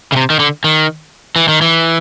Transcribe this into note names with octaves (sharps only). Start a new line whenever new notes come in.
C#3
C3
D#3
D3
D#3
E3
D#3
E3